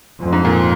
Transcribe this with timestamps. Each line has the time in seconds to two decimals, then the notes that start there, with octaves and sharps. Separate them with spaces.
0.21 F2
0.33 G#2
0.45 A#2